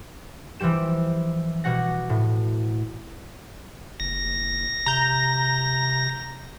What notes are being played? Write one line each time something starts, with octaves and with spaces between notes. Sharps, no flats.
E3 F3 G3 G4 E7
B2 G3 F#4 F#5 A#6
A2
F#1 A#6
C3 A#5 G6